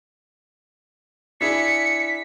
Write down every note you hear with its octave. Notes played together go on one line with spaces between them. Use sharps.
D4 E4 G#4 B6 C#7